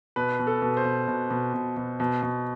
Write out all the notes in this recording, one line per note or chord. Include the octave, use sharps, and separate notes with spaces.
B2 B4
B2
A4
B2
C5
B2
B2
B2
B2
B2
B2
B2